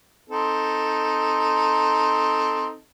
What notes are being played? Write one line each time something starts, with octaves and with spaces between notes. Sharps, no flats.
C4 D#4 A4